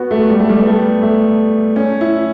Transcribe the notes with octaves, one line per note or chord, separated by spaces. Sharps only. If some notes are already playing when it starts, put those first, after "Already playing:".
Already playing: B3 F#4
A3
G3
A3
G3
B3
A3
A3
C#4
E4